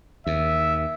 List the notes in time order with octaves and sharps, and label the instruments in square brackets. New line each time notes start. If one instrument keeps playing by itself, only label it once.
[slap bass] D#2 [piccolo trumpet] E5